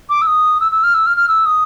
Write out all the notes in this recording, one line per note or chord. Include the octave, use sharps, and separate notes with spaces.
D6
E6
D#6
E6
E6
F6
E6
F6
F6
E6
D#6